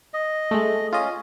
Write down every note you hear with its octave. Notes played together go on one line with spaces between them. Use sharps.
D#5
G#3 A3
C#4 F4 D#5